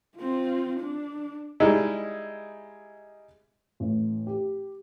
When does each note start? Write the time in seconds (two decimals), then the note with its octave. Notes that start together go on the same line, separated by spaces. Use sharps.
0.18 C4 F4
0.80 D4
1.60 G3 G#3 D#4 E4
3.80 A1
4.27 G4